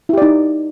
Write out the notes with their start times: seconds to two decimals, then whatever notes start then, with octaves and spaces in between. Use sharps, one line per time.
0.09 E4
0.13 G4
0.18 D5
0.22 D#4